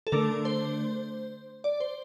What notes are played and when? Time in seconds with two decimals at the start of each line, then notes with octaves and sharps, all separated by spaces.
0.07 A4
0.12 D3 A3 D4 A#4
0.45 C5
1.64 D5
1.80 C5